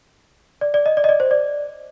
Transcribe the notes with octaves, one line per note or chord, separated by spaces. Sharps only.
D5
D5
D#5
D5
D#5
D5
C5
D5